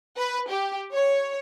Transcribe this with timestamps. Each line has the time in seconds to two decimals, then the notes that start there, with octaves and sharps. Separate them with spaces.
0.17 B4
0.50 G4
0.93 C#5